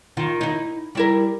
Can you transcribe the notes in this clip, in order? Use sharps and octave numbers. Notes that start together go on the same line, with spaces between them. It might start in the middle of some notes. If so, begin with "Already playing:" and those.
D#3 F4
D#4 E4
G3 E4 A#4